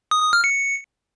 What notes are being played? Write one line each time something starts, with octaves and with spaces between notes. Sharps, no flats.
D#6
D#6
F6
C#7